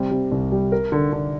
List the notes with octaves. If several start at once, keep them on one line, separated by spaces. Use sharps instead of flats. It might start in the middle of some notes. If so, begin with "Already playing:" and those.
Already playing: C3 G3
C3
C2
G3
A#4
D3
D3